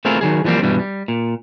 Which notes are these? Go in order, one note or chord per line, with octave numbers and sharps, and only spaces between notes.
A3 C4 E4 F4 G#4 A#4
D#3 F#3 G#4
E3 F3 G3 A#3 C4
G2 B2 E3 G3
G3
A#2